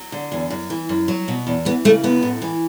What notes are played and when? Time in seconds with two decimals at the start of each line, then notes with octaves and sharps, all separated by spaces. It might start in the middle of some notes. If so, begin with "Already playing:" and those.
Already playing: F#3
0.12 D3
0.32 E2
0.50 F#2
0.70 E3
0.89 F#2
1.08 F#3
1.28 B2
1.47 E2
1.65 E3 B3
1.85 C#3 A3
2.03 F#2 B3
2.23 A2
2.42 E3